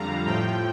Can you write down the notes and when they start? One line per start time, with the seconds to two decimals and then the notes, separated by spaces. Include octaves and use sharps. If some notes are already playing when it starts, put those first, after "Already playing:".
Already playing: F2 D3 G3 F5 A#5
0.26 A2 F3 G5